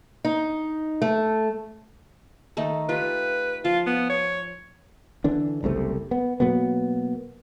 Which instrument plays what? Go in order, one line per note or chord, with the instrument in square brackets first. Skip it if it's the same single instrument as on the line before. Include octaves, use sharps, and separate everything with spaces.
[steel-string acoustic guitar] D#4
A3
[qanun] D#3 A3 D#4
[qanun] F4 G4 [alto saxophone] B4
[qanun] F3 [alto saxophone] F4
[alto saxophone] B3
C#5
[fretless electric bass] D3 E3 D4
F#1 C2 C3 A3
B3
B2 F#3 A#3 B3